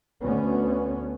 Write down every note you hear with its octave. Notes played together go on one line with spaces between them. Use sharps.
D2 B3 C#4